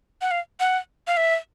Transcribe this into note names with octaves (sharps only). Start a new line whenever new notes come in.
F#5
F5
F#5
F5
E5